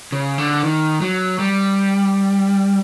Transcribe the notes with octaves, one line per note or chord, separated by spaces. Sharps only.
C#3
D3
D#3
F#3
G3